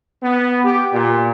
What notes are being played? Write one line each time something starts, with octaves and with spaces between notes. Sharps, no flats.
B3
G4
A#2